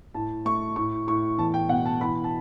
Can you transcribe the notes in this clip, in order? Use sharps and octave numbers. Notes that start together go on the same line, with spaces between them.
A2 A5
A3 C#6
A2 C#6
A2 C#6
E2 A5
G5
B2 F#5
A5
E3 B5
A5